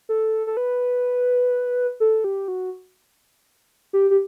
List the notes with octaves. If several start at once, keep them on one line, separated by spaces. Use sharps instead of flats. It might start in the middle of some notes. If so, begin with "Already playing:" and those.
A4
A4
B4
A4
G4
F#4
G4
G4